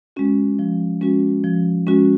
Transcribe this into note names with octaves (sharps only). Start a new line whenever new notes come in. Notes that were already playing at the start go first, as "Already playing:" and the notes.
G#3 C#4 F#4
F3
G#3 C#4 F#4
F3
G#3 C#4 F#4